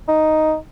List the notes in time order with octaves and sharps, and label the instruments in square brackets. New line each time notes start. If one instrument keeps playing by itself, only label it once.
[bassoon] D#4